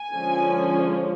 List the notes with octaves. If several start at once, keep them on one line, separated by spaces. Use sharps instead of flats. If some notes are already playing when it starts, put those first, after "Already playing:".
Already playing: G#5
D3 F3 G#3 C#4